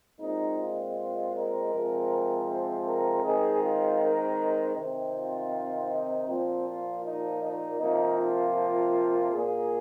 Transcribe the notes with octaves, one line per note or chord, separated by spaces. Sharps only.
A#2 G#3 C4 D#4
F4
A#4
C3 F3 G#3 C4
C5
A#4
D#3 G#3 C4 G#4
F4
A#4
C3 D#3 C4
F4
D#4
A#2 F3 A#3 C4
F4
D#4
D#4
C3 F3 A#3 D#4
F4
A#2 A#3 G#4